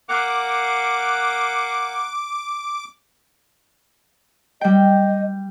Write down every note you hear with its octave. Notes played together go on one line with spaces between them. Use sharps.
A#3 F#5 D6
G3 D#5 G5